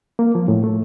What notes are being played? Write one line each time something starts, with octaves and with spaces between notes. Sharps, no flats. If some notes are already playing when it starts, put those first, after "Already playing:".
A#3
F3
A2
A3